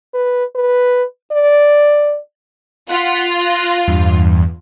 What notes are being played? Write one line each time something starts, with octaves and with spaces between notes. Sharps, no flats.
B4
B4
D5
F4 F#5 B6
F#6 A#6
E2 G2